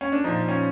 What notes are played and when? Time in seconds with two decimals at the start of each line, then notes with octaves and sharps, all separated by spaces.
0.01 C#4
0.12 D4
0.24 A#2 F3 D#4
0.49 C#4